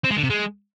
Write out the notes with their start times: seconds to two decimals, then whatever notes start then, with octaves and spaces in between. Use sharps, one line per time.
0.05 C4
0.11 G#3
0.17 D3
0.24 C3
0.30 G#3